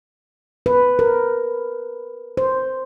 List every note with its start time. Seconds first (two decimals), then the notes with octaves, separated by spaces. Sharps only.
0.66 B4
0.99 A#4
2.37 C5